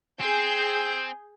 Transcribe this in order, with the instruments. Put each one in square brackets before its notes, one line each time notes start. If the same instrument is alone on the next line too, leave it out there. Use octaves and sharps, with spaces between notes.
[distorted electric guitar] C4 [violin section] G#4 G6